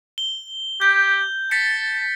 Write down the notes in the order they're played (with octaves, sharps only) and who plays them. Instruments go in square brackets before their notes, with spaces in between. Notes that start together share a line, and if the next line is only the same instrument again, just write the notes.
[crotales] G7
[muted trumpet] G4 [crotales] G6
[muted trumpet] A5 [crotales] A6 B6 C#7